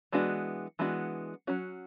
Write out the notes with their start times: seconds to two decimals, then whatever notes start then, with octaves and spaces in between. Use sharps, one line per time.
0.12 E3 G#3 B3 D4 F#4
0.79 E3 G#3 B3 D4 F#4
1.47 F#3 C#4 F#4